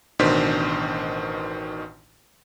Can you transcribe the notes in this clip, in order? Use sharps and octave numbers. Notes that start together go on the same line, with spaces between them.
A1 B2 D#3 D4 C5 B6